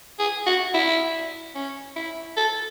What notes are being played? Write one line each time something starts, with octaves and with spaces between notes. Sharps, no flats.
G#4
F#4
E4
C#4
E4
A4